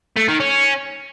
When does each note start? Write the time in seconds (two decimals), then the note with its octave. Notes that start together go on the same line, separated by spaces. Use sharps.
0.17 A3
0.28 D#3
0.40 C#4